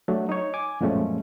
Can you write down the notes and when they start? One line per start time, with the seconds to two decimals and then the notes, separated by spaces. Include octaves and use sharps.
0.08 F#3 A3 D4
0.29 D#4 C#5
0.54 G#5 D6
0.81 F#2 A#2 F3 G#3 A3 C#4